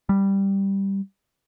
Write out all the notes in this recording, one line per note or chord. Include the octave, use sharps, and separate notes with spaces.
G3